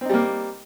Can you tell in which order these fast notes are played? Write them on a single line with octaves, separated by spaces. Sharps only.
C4 D#4 G3 A#3